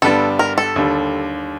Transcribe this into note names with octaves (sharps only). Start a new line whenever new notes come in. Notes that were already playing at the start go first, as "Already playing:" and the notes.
G2 D3 G3 B3 D4 A4
A#4
A4
D#2 D3 G3